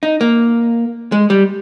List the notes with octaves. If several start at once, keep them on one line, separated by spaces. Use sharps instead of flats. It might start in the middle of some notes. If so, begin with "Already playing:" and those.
D#4
A#3
G#3
G3